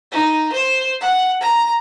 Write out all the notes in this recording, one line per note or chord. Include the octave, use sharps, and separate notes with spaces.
D#4
C5
F#5
A#5